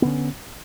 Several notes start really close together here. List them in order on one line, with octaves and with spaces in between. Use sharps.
B3 D3 C#4